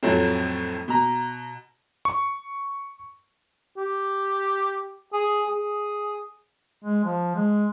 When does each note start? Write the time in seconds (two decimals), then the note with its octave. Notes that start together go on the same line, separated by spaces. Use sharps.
0.03 F2 A2 F3 F#3 A3 C4
0.88 B2 A#5
2.05 C#6
3.77 G4
5.13 G#4
5.47 G#4
6.82 G#3
7.05 F3
7.36 G#3